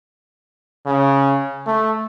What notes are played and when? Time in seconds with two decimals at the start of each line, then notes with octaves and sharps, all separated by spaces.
0.86 C#3
1.66 A3